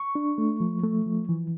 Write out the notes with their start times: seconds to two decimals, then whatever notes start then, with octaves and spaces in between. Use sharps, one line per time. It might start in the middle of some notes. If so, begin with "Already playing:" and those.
Already playing: C#6
0.15 D4
0.38 A3
0.60 F3
0.84 A3
1.06 F3
1.29 E3